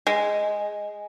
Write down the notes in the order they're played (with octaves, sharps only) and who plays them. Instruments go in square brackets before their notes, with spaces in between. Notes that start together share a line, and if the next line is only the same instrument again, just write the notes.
[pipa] G#3